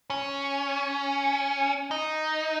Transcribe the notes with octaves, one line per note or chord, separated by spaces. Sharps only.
C#4
D#4